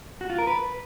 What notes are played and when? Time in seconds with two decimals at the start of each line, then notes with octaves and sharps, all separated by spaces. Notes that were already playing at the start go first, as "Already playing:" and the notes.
0.21 F#4
0.30 F4
0.39 A#4
0.47 B4